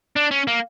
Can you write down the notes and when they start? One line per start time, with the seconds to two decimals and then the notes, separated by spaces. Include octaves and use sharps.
0.16 D4
0.31 C#4
0.48 A#3